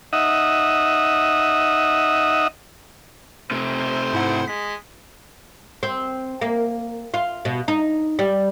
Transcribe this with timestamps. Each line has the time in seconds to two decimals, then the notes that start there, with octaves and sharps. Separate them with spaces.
0.13 D#4 D#5 E5 F#5
3.51 C3 A3 C5
4.13 G#2 E4 F#5
4.48 G#3 B6
5.83 C4
6.41 A#3
7.14 F4
7.45 B2
7.68 D#4
8.19 G3